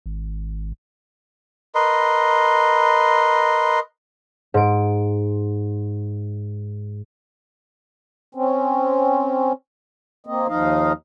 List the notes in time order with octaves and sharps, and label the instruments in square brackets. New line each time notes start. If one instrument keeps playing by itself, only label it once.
[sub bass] G#1
[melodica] A#4 B4 D#5 C6
[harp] G#2 D7
[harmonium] C4 C#4
A#3 C4 D#5
D#2 F3 D#4 D#5 F5